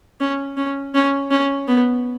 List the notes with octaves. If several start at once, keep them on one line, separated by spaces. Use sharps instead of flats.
C#4
C#4
C#4
C#4
B3